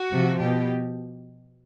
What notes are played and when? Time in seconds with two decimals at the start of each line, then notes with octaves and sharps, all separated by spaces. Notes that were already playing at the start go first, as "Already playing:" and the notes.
Already playing: F#4
0.12 C3 F3
0.41 B2 G4